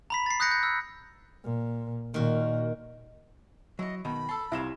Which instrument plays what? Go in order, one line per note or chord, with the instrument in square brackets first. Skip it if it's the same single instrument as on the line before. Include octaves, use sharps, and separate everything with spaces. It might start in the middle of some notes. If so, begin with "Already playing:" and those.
[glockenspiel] A#5 B5 B6
A6 C7
D#6 F#6 G6 A#6 C#7
G6
E6
[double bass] A#2
[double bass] A#2 [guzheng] D#3 F#4
[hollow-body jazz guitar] F#3 [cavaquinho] E4 C#6 [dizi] D#5
[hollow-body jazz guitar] B2 D#3 D#4 [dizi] B5
[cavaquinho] A4 A5 [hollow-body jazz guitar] C6
[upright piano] C2 E7 [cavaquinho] E4 F4 C#5